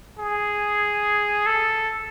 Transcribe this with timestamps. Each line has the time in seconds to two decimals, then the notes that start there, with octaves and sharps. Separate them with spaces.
0.19 G#4
1.46 A4